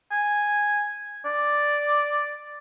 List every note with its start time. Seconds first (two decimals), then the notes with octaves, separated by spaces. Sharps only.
0.11 G#5
1.25 D5